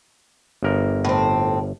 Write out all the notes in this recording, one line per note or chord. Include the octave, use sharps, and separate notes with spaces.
G1 A#4
A2 C4